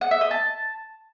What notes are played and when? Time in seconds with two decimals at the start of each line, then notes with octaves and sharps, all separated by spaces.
0.01 F#5
0.11 E5
0.21 D#5
0.31 A5